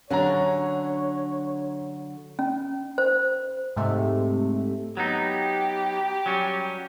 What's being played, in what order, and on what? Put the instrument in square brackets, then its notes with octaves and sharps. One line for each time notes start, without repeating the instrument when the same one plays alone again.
[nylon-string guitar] D3 F#3 D4 [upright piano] C#4 A#5 [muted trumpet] C#5
[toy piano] C#4
C5
[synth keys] G#2 C3 A3
[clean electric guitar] F#3 B3 D#4 [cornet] G4
[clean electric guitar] F#3 G3 C#4